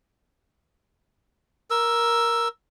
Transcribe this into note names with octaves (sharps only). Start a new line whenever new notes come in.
A#4 E6